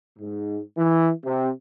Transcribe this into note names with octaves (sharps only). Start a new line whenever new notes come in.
G#2
E3
C3